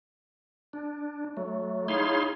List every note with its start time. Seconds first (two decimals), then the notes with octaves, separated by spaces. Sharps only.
0.73 D4
1.37 F#3 A3
1.88 D#4 E4 G#4 C#5 F5 C6